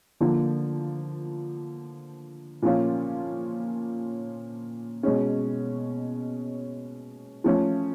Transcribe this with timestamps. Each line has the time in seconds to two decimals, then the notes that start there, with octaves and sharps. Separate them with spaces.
0.21 D3 F3 A#3
2.62 A#2 F3 A#3 C#4 F4
5.03 B2 G#3 C#4
7.44 F3 A3 C#4